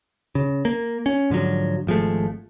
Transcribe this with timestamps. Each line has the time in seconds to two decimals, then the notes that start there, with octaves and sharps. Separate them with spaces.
0.35 C#3
0.65 A#3
1.06 C#4
1.30 G#2 D3 F3 F#3
1.87 G#1 F3 G#3 A3